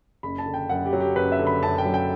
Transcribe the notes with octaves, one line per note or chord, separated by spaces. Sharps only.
F#1 B5
A5
D3
G5
F#2 F#5
G4
F#3
G4
F#1 B4
E5
D3
B5
F#2 A5
G5
F#3
G5